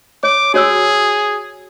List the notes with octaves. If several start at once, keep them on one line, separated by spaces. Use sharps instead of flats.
C#5 D6
F#4 G#4 C#5 E6